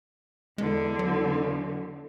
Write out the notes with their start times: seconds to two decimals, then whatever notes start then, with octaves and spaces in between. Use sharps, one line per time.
0.58 E2 D3 G#3
0.99 F#3